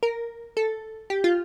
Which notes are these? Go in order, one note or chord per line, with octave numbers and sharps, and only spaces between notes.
A#4
A4
G4
F4